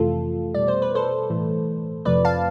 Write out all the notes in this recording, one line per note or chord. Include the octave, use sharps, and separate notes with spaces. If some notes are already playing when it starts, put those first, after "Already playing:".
Already playing: F2 C3 E3 A3 F4 A4
B2 G3 D5
C5
B4
A4 C5
A2 E3 A3
F2 C3 F3 A3 B4 D5
F5 A5